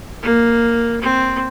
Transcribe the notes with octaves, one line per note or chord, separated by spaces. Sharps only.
A#3
C4